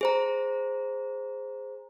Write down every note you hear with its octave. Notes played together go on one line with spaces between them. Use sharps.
G#4 C5 A#5